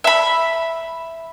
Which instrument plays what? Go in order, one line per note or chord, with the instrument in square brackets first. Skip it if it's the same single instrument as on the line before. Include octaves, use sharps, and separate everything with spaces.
[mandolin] E5 B5